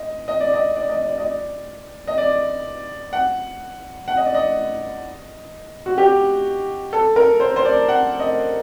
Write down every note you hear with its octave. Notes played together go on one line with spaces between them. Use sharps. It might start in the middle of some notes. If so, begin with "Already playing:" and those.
Already playing: D#5
D#5
D5
D#5
D5
D#5
D5
D#5
D5
D#5
D5
F#5
F#5
D#5
D5
D#5
F#4
G4
A4
A#4
C5
C5
D5
F#5
D#5